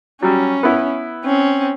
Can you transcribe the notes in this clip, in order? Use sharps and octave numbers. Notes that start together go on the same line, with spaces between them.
F#3 G3 C#4
B3 E4
C4 C#4